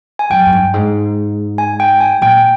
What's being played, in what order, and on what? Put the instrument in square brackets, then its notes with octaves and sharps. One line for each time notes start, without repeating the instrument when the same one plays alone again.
[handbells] G#5
[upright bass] F#2 [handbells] G5
[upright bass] F#2
G2
G#2
[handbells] G#5
G5
G#5
[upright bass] A#2 [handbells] G5